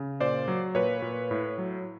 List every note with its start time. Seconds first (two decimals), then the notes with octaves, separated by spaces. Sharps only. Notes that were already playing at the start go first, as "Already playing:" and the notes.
Already playing: C#3
0.20 A#2 C5 D5
0.48 F#3
0.75 A#2 B4 C#5
1.02 A#2
1.31 A2
1.58 F#3